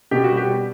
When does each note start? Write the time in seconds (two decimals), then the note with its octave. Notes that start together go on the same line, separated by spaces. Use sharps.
0.11 B2 G4
0.24 G3 F#4
0.37 G4
0.47 G3